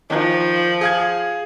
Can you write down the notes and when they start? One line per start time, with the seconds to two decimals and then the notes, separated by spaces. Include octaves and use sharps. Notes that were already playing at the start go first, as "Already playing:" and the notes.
0.10 D#3 F3
0.81 G#4 F5 G#6